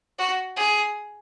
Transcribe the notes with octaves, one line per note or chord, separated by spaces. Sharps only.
F#4
G#4